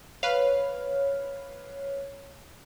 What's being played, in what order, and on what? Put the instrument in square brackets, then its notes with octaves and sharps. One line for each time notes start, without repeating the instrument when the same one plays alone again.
[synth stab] B4 F5 [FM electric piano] C#5